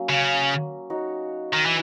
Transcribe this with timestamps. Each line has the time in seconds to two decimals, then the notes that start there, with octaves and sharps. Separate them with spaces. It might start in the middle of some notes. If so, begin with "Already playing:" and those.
Already playing: F#3 A#3 C#4
0.09 C#3
0.90 D#4 F#4 C#5
1.53 D#3
1.66 E3